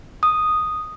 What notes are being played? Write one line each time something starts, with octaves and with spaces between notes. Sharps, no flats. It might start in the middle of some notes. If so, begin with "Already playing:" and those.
D#6